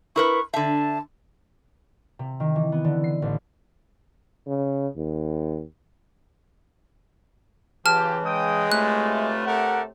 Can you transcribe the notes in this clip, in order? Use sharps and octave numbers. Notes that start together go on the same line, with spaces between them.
E4 A#4 B4 C#6
D3 E5 A5
C3
D#3
E3
B3
D3
C7
A1
C#3
D#2
C#3 E3 F4 G4 A5 F6
G#3 G5 D#6
A2 C3 A3 D4 F4 B4 F#6
G4 A4 A#4 F#5